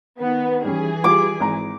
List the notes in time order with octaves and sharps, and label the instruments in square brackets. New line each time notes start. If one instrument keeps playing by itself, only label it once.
[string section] D#3 B3
[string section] E3 G#4 [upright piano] G3 C#4
[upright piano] G3 F4 G4 [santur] D6
[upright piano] G#1 A#5